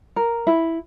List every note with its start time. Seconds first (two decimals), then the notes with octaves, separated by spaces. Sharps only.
0.16 A#4
0.47 E4